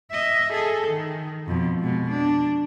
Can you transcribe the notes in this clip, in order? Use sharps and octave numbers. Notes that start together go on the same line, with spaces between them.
D#5 E5
G#4 A4
D#3
F2 B2
B2 G#3
D4